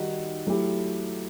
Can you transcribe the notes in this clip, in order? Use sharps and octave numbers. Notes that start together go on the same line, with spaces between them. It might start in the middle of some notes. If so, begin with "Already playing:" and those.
Already playing: D#3 G3 D#4 F#4
F#3 A3 E4 G4